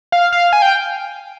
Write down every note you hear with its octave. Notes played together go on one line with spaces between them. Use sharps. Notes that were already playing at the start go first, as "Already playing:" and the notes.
F5
F5
G#5
G5